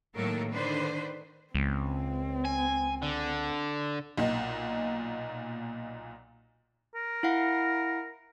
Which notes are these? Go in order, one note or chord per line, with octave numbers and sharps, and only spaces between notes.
A2 D#3 F#3 A#3 A4 A#4
D3 D#3 D4 B4 C5
C#2 C4
G#5
D3
B1 A#2 D#4
A#4
E4 F5 F#5